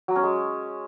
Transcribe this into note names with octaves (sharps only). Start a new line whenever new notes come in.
F#3
C#4
G#3